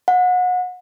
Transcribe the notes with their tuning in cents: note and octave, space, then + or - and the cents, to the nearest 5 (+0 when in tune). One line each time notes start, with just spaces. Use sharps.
F#5 -30